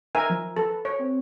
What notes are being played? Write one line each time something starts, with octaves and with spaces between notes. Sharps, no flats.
D#4 A#4 E5 G#5
F3
A4 B4
C#5
C4